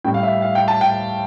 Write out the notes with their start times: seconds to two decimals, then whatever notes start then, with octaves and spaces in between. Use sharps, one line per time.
0.04 A2 G3 G5
0.14 F5
0.23 E5
0.42 F5
0.55 G5
0.68 A5
0.81 G5